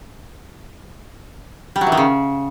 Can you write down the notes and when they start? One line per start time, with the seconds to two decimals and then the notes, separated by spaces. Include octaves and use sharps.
1.76 G3
1.81 F#3
1.87 E3
1.92 D#3
1.97 C#3